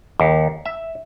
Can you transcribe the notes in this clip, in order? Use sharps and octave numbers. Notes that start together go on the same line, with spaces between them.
D#2
E5